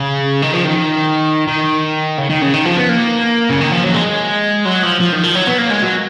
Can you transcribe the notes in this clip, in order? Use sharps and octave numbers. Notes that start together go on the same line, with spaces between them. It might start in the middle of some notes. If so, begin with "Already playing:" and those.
Already playing: C#3
D#3
F3
D#3
D#3
C#3
D#3
C#3
D#3
F3
B3
A#3
C#3
D#3
F3
F#3
G#3
F#3
F3
F3
D#3
F3
F#3
B3
A#3
G#3
F#3